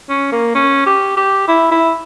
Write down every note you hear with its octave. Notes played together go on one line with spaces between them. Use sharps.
C#4
A#3
C#4
G4
G4
E4
E4